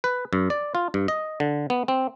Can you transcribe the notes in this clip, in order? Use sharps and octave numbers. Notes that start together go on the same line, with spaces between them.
B4
F#2
D5
F4
G2
D#5
D3
B3
C4